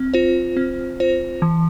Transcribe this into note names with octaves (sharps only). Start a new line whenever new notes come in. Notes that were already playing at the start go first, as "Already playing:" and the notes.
Already playing: C4
F4 C5
C4
F4 C5
E3